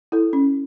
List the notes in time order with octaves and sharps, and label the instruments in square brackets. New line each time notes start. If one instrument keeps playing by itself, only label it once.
[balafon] E4 A4
C#4